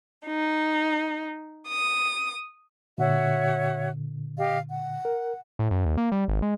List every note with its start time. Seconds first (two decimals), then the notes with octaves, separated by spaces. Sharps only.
0.25 D#4
1.67 D#6
2.98 A#2 D3 F#4 C#5 E5
4.37 G4 D#5 F5
4.69 F#5
5.05 A#4
5.59 A2
5.71 F#2
5.85 D#2
5.97 A#3
6.12 G3
6.28 G#1
6.42 G#3